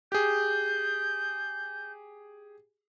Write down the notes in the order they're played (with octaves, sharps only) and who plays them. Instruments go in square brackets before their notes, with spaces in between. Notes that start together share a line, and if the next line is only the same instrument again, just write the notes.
[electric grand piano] G4 G#4 [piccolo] G6